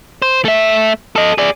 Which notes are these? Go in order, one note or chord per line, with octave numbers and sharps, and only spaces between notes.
C5
A3 E5
A4 D#5
G#4 D5